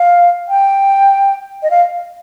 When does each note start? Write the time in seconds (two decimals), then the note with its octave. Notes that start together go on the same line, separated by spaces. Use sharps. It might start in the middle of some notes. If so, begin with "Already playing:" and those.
Already playing: F5
0.48 G5
1.63 D#5
1.70 F5